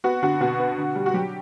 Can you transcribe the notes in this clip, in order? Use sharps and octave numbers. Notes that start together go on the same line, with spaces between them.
B3 F#4
D3 F#4
B2 F#4
B3
D3
G3
F#4
F#3 G4